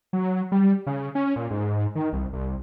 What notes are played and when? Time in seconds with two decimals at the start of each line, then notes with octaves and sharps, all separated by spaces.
0.13 F#3
0.52 G3
0.87 C#3
1.15 C#4
1.36 A#2
1.51 G#2
1.95 D#3
2.13 C2
2.33 C2